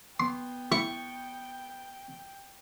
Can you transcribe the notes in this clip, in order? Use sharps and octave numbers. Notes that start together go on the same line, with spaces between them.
B3 G5 C6
E4 C#6